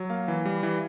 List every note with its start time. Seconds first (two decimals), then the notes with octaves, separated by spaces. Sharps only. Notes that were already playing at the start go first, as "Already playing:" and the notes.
Already playing: F#3
0.10 A#3 F5
0.28 E3
0.45 G3
0.63 E3